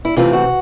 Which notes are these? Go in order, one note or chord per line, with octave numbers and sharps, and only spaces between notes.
E4
C3 E3 A3 C4 F4
F#4